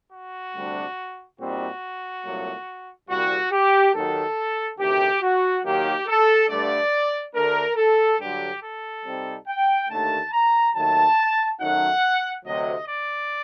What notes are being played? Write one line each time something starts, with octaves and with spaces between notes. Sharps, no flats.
F#4
D2 C3 G3 D4
A#2 G3 C4 D#4 F#4
C2 A#2 F#3 A3
C2 A#2 G3 F#4
G4
D#2 D#3 F#3 A4
D2 C3 D#3 A3 G4
F#4
D#2 D#3 F#3 A#3 D#4 G4
A4
G2 D3 A3 D5
D2 D3 A3 D4 A#4
A4
G2 D3 F#3 G4
A4
C3 G3 C4 D#4
G5
D#2 D3 A3 A5
A#5
D#2 D#3 F#3 A3 A5
F#2 D#3 F#3 A3 D#4 F#5
D2 C3 F#3 D#5
D5